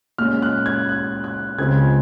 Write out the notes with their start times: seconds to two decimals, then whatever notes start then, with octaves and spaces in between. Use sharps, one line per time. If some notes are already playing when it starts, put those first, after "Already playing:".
0.18 A#2 G#3 C#4 F6
0.42 F#6
0.66 G#6
0.89 F#6
1.24 F#6
1.58 C#2 C#3 G#3 C4 F4 G#6